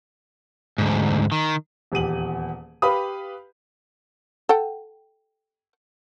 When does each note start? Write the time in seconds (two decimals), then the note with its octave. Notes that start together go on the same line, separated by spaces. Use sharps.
0.78 D2 G#2
1.32 D#3
1.92 D#1 E2 G4 D#7 F#7
2.82 G4 B4 F5 B5 D#6
4.49 A4 F#5 G5